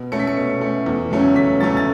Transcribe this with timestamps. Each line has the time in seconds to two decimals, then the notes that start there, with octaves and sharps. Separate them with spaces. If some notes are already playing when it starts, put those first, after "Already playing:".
Already playing: B2
0.12 A3 C#4 C#7
0.19 B6
0.27 C#7
0.37 B2
0.61 A3 C#4
0.86 E2
1.11 C#3 F#3 A3 C#4
1.36 E2 B6
1.60 C#3 F#3 A3 C#4 A6
1.77 A6